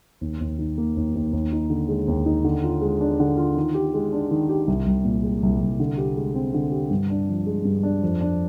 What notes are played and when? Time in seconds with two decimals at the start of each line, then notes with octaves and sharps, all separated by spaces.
0.21 D#2
0.40 D#2
0.59 D#3
0.78 A#3
0.97 D#2
1.15 D#2
1.33 D#2
1.53 D#4
1.70 D3
1.88 G#3
2.08 D#2
2.26 D#4
2.44 D3
2.64 F4
2.82 G#3
3.01 D4
3.20 D3
3.37 F4
3.57 D#3
3.74 G4
3.94 G#3
4.12 D4
4.31 D#3
4.49 G4
4.67 C2
4.86 C2
5.05 A#2
5.23 G#3
5.43 C2
5.60 C2
5.80 D3
5.98 G4
6.17 G#3
6.35 C4
6.54 D3
6.72 G4
6.91 G2
7.10 D4
7.29 F3
7.46 G#3
7.65 G2
7.83 D4
8.03 F2
8.21 D4